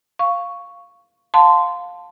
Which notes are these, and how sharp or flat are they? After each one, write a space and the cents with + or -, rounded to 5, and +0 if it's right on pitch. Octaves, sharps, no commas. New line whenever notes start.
F5 +0 C#6 +0
F5 +20 A5 +0 C6 -15